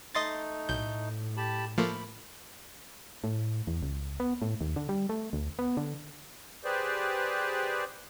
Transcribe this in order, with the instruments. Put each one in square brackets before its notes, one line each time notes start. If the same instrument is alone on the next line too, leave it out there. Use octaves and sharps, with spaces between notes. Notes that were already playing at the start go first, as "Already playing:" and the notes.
[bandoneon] A3 D#4 [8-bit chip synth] D#5 C6 A6
[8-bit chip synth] B1 G6 [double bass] A2
[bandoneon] G4 A5 B5
[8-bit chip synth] F3 A3 A#3 [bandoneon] B5
[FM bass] A2
E2
C#2
B3
A2
D#2
D3
G3
A3
D2
B3
D3
[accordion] G4 G#4 B4 C5 D5